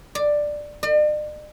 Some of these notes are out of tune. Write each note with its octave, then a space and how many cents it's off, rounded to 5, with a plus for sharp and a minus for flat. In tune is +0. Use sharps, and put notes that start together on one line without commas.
D5 +10
D5 +45